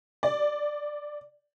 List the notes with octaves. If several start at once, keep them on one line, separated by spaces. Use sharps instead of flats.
D5